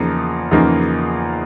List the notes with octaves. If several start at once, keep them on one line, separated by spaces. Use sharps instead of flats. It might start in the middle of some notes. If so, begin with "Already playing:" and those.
Already playing: E2 C#3 F3 A#3 D#4
E2 C#3 F3 A#3 D#4